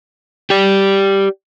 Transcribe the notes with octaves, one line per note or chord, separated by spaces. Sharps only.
G4 D5